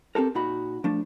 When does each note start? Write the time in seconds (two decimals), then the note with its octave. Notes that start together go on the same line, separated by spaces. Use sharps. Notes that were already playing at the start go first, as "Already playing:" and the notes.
0.15 C4 G4 A4 A#4
0.35 A#2 D#4 F#4 B5
0.84 F3 A3 D4